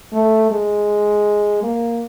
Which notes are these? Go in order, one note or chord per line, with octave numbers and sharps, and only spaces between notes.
A3
G#3
A#3